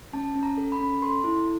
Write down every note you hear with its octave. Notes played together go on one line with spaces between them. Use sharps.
C#4 A5
C#4
A#5
A4
B5
C#4
A4 C6
E4